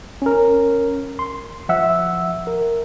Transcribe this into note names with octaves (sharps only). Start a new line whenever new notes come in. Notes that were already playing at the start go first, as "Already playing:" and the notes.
C#4 A#4
C6
F3 E5 F#5 E6
A#4